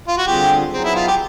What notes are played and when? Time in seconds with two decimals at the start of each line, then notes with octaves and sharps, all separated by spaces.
0.08 F4
0.17 F#4
0.27 D3 G3 C4 F4 G4 G#4
0.73 F#3 B3 C4 D#4 G#4
0.84 E4
0.96 F4
1.07 G4